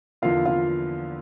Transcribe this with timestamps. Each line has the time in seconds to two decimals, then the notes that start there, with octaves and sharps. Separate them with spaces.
0.22 E2 D3 F3 A#3 E4 F4 F5
0.45 F4 F5